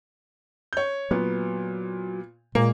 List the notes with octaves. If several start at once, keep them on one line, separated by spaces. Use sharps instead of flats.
C#5 G6
A#2 F#3 B3
A#2 G#3 A#3